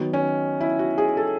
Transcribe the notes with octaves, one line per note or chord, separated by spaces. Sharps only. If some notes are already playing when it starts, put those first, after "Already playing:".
Already playing: D#3 F#3 B3
C#4
E4
F#4
G#4
A4